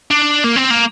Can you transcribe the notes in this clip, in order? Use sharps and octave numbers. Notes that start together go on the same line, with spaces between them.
D4
A#3
C4
A#3